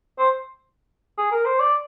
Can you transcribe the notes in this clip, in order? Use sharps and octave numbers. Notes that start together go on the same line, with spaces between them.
C5
G#4
A#4
C5
D5